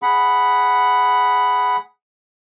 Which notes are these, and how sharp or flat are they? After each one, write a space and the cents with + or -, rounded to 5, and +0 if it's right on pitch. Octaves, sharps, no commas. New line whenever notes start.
G#4 +0 F#5 +0 B5 +0